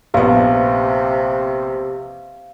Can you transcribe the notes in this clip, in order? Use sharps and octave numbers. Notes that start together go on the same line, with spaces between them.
A#1 C3 B3 F5